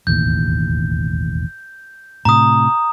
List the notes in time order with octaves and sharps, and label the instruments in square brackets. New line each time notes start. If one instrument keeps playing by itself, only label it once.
[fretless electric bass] E1 A1 D#2 [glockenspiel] G6
[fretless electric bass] A2 C3 [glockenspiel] A#5 D#6